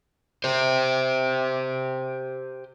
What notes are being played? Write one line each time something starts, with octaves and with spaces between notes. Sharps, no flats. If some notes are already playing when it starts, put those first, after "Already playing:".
G4 C5